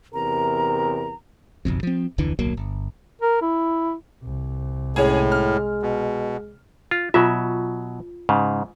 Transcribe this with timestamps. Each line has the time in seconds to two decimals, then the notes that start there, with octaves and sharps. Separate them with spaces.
0.14 E2 C3 A#4 A#5
1.65 F#1 B1 F2
1.83 F3 C4
2.18 F1 D2 D3 E3
2.39 D1 B1 F#3 A#3
2.57 G1
3.22 A#4
3.42 E4
4.23 C2
4.96 A2 G#3 C#4 G#4
5.32 F6
5.83 B2
6.91 F4
7.14 B2 F#3 F4 E5
8.29 G#2 C#3